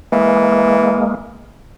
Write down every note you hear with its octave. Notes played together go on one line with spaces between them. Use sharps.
E3 G#3 A#3